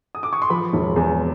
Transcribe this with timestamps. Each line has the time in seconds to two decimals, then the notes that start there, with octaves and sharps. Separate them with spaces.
0.15 D#6
0.23 D6
0.33 C#6
0.42 C6
0.50 F3 B5
0.73 E1
0.96 E2